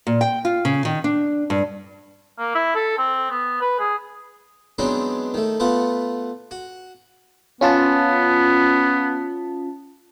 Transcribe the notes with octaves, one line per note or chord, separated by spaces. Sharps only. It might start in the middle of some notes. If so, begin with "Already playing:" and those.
A#2
G5
F4
C#3
D#3
D4
G2
A#3
E4
A4
C4
B3
B4
G#4
F#3 G#3 B3 C4 D4 D#4
D#3 A3
A3 B3 F4 F#5
F#4
B3 C#4 F4 A5